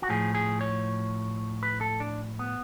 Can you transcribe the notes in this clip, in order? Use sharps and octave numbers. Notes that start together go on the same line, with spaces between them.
F#4
A2 F3 G#4
G#4
C#5
B4
A4
D4
B3